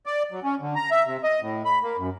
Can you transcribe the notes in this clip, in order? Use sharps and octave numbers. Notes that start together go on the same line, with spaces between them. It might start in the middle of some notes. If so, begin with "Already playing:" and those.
D5
F#3
C#4
D3
A#5
E5
C3
D#5
A2
B5
A#3
F#2